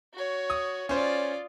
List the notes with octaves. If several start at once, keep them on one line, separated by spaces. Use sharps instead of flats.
F#4 C#5
D#6
C#4 F4 C5 D5